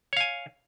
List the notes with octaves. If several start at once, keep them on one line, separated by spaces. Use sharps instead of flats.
C#5 F5 G#5